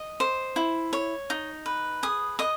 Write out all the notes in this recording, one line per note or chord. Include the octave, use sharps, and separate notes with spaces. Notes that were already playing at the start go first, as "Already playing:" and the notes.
Already playing: D#5
C5
E4
C#5
D#4
B4
G#4 D#6
D#5 D#6